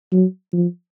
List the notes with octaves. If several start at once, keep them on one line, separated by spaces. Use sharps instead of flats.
F#3
F3